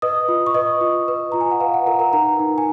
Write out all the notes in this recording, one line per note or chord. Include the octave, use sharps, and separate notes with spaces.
B4 D#5 D#6
F4
C#6
B4 D#5 D#6
F4
B4
F4 A#5
G#5
F#5
B4 F5
F#5
F4 A#4 A#5
A#4 A#5
D#4 A#4 A#5
D#4
G#5